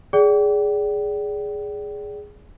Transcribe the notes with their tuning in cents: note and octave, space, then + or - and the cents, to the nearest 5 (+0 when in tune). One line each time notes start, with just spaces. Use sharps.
G#4 +0 D5 -25 G5 -35